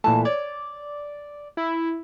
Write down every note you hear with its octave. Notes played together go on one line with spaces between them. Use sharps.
A#2 E3 A3 A5
C#5 D5
E4